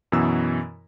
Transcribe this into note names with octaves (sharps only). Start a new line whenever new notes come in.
F#2 B2 E3 B3 E6